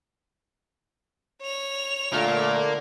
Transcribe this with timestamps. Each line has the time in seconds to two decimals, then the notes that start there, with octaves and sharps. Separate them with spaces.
1.41 C#5 F7
2.13 A#2 D3 A3 A#3